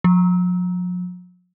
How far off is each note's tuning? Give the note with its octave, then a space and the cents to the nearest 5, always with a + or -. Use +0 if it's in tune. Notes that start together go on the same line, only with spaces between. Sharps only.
F3 +45